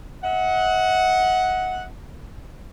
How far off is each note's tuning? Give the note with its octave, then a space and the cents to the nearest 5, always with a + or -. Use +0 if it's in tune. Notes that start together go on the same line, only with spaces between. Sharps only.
D#5 +45 F#5 +0